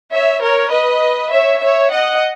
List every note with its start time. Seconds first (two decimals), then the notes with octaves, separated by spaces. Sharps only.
0.12 C#5 E5
0.41 A#4 C#5
0.72 B4 D#5
1.32 C#5 E5
1.62 C#5 E5
1.92 D#5 F#5